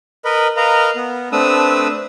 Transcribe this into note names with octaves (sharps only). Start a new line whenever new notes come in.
A#4 B4 D#5 B5
A#4 B4 D#5 F5 A#5
B3
A3 C4 D4 B4 D#6 E6